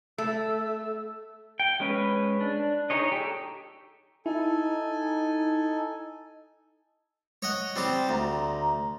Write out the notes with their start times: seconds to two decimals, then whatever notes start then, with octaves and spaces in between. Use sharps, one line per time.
0.18 A3 E6
1.60 G5
1.80 G#3 C#4 B4
2.41 D4
2.90 D#4 G#4 C#5 D#5
3.12 G4 A4
4.26 D#4 E4 A4 G#5
7.42 C#5 D#5 F#5
7.76 G3 C4 G4
8.09 D2 A#5